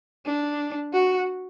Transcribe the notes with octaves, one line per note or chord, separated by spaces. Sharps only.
D4
F#4